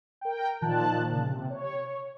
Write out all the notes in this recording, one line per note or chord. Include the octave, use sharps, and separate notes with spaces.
A#4 G5
A#2 D#3 F3 A5 F#6
A#2 C#3
C3
C#5